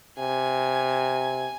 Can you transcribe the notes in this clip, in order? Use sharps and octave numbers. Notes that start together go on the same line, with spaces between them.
C3 G#5